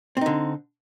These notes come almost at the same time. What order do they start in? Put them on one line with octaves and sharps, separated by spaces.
C4 D#4 D3